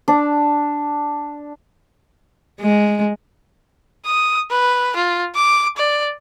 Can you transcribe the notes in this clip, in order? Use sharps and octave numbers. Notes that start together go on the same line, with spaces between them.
D4
G#3
D#6
B4
F4
D6
D5